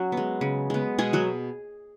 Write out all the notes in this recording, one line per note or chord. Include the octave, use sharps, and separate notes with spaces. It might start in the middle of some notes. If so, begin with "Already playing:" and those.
Already playing: F#3 C#4 F#4
B3
G#3
C#3
G#3 B3
B2 G#3 G#4
F#3 F#4